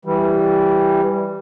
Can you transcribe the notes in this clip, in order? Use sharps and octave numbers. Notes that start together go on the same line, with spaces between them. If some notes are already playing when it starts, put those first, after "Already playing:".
E3 G3